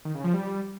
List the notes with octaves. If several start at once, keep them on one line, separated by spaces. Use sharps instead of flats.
D#3
C#3
F3
G3